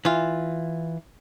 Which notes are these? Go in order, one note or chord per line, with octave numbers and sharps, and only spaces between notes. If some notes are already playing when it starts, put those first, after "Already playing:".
E3 F4